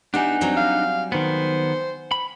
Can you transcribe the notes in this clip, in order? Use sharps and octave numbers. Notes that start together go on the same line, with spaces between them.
B3 D4 D#4 G4 E5 F#5 G#5
F#3 G3 C4
F5
D#3 B3 C5
B5